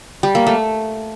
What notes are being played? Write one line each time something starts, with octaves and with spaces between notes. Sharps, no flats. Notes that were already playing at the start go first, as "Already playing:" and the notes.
G3
A#3
A3